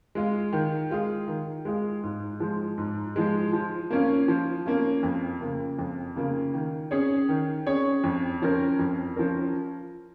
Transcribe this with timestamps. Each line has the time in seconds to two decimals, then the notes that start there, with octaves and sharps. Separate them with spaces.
0.15 G#3 F4
0.53 D#3
0.91 G#3 F4 G#4
1.28 D#3
1.65 G#3 F4 G#4
2.03 G#2
2.40 F3 G#3
2.78 G#2
3.16 F3 G#3
3.53 F3
3.91 A#3 C#4 F4
4.28 F3
4.66 A#3 C#4 F4
5.03 F2
5.41 C#3 A#3 F4
5.79 F2
6.16 C#3 A#3 F4
6.54 D#3
6.91 C#4 G#4 C#5
7.29 D#3
7.66 C#4 G#4 C#5
8.04 F2
8.42 F3 C#4 A#4
8.79 F2
9.16 F3 C#4 A#4